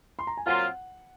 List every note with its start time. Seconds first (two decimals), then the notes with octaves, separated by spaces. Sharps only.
0.19 C6
0.27 A#5
0.37 G#5
0.46 A#2 F#3 C4 F4 F#5